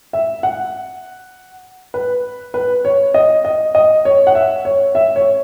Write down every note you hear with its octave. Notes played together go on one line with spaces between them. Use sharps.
E5
F#5
B4
B4
C#5
D#5
D#5
D#5
C#5
F#5
E5
C#5
E5
C#5